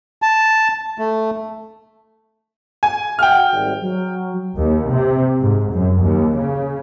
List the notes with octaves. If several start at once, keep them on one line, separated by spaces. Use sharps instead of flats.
A5
A3
G#5
F#4 E5 F#5 G5 F6
G#1 G3
F#3
D#2
C3
G#2
F#2
D#2
C#3